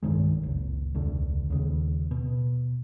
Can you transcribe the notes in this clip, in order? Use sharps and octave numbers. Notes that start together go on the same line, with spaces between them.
C2 G2 D#3 G#3
F#1 C#2
E1 C#2 D3
D#2 C#3
B2